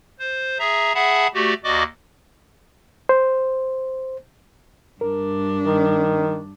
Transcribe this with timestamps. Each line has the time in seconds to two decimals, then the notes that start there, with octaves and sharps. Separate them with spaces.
0.19 C5
0.59 G#4 E5 A#5
0.95 G#4 E5 F#5 A5 B5
1.34 A3 F#4 G4 D5
1.64 D#2 F#4 D5 D#5 D6
3.09 C5
5.01 G2 D4 A#4
5.66 D#3